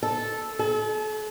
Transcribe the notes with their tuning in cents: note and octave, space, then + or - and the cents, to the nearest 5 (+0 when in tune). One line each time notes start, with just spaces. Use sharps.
A4 -10
A4 -40